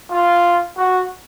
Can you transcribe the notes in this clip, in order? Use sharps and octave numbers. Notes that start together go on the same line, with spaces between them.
F4
F#4